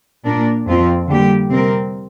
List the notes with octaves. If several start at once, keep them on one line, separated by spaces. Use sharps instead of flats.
A#2 A#3 D4 A#4
F2 F3 C4 F4
D3 G3 A#3 G4
C3 G3 C4 A#4